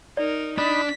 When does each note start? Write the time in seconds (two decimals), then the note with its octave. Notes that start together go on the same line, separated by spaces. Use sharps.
0.17 D#4 A#4 D5
0.58 D4 D#4 B5 B6